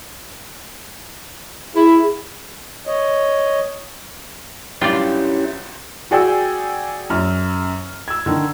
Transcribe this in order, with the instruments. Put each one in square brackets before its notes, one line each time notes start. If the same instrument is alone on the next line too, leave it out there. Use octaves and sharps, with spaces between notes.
[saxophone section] E4 [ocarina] G#4
[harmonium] C#5 D#5
[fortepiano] B1 G2 G5 [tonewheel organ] C#4 E4 G4 [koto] F4 D5
[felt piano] F#4 G#4 D5 G5 G#5 E6
F#2 F6
E6 G#6
D3 D#3